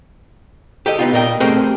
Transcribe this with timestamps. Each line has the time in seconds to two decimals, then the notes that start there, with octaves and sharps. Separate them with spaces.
0.86 G4 A4 D#5
0.99 B3 D#4 F4
1.13 A#2 A#4 D#5 G5
1.40 A3 C4 G4 G#4 A#4 C5